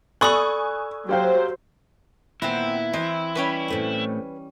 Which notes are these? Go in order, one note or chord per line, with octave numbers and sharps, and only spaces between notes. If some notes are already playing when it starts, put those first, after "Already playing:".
A4 D5 G#5 B5 C#6 D#6 E6 F#6
F#3 G4 C5 F5 G5
A#2 D#3 B3 C4 E4 F#5 A#5
E3 C4 D#5
G3 C#4 B4 C#5 G5
A2 A3 C4